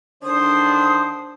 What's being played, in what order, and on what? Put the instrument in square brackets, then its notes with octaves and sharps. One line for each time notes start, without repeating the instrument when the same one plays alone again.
[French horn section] D3 D#3 D4 [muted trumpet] C5 [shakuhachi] D#6